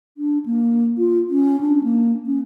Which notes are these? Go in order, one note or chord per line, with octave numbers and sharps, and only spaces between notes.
D4
A#3
F4
C#4
D4
A#3
C#4